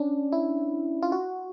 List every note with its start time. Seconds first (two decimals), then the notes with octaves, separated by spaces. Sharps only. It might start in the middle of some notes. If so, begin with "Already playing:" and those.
Already playing: C#4 D4
0.32 E4
1.02 F4
1.12 F#4